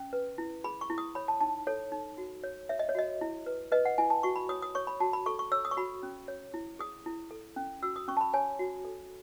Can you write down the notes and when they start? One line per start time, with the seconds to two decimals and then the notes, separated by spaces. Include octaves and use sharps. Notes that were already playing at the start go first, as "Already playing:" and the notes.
Already playing: C#4
0.13 B4
0.38 E4
0.64 G#4 B5
0.81 C#6
0.90 E4
0.98 D#6
1.15 C#5 B5
1.28 A5
1.41 D#4 A5
1.67 A4 C#5
1.92 D#4
2.18 F#4
2.43 C#5
2.69 C#5 E5
2.79 D#5
2.89 C#5
2.95 F#4 D#5
3.21 E4
3.46 B4
3.72 B4 D#5
3.85 F#5
3.98 E4 G#5
4.10 A5
4.23 F#4 C#6
4.36 B5
4.49 C#5 D#6
4.62 D#6
4.75 C#5 C#6
4.87 B5
5.00 F#4 A5
5.13 B5
5.26 A4 C#6
5.39 C#6
5.52 C#5 E6
5.65 D#6
5.71 C#6
5.77 F#4 B5
6.03 C#4
6.28 C#5
6.54 E4
6.79 G#4 D#6
7.06 E4
7.31 A4
7.56 C#4
7.83 F#4 E6
7.96 D#6
8.08 C#4 C#6
8.17 A5
8.21 B5
8.33 C#5 G#5
8.59 F#4
8.85 A4